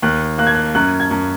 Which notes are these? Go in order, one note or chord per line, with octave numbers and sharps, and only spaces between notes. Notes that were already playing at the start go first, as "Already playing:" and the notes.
D#2 F#6
A#3 F#6
G#6
F#6
F#2 F#6
G#6
F#2